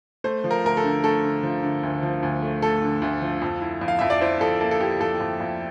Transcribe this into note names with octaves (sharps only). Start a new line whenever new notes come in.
A3 C5
F3
A#4
D2 A#4
A4
D3
A3 A4
D3
F3
D3
D2
F3
D2
A3
A3 A4
D3
D2
F3
F2
E4
F2
F5
F2 E5
D5
E4 C5
F2 A4
A#3 A4
A4
E4 G4
F2 A4
F2
F2